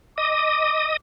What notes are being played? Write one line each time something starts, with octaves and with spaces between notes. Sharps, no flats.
D#5 D6 D#6